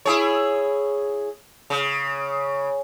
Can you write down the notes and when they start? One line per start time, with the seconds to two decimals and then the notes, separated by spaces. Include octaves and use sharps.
0.06 E4 G#4 C#5
1.70 C#3